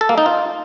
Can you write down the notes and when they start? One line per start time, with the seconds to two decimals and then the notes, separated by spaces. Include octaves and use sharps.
0.01 A4
0.09 A#3
0.18 D#4
0.26 F4